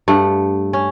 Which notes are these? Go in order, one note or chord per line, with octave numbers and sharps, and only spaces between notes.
G2 A3 F#5
C#4